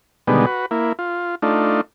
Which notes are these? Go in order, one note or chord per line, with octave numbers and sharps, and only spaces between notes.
B2 D3 D#3 G3 G#3 B3
F#4 B4
A#3 E4
F4
A3 D4 D#4 F4